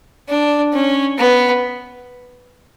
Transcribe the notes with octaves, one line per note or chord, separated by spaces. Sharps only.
D4
C#4
B3